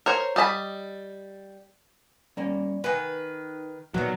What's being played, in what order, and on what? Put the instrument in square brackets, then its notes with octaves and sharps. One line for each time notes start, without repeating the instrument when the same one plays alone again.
[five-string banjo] A#4 C5 C#5
G3 D#5 A5 B5
[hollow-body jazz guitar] G3 A#3 C#4
[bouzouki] D#3 B4 [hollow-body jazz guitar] F#5 G#5
[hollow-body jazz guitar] A#2 [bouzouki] D#3 B3 [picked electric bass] F#3